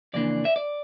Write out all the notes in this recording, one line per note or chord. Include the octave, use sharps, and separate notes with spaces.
F2 C#3 E3 A#3 D4 D5
E5
D5